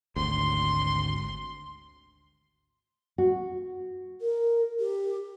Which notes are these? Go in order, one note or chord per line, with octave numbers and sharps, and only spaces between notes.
G#1 D2 C6
F#4
A#4
G4